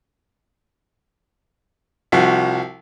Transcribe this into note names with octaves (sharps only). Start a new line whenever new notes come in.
C2 F3 F#4